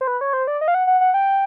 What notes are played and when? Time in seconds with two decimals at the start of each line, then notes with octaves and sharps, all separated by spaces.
0.01 C5
0.08 B4
0.21 C#5
0.33 C5
0.47 D5
0.61 D#5
0.68 F5
0.74 F#5
0.87 F#5
1.01 F#5
1.14 G5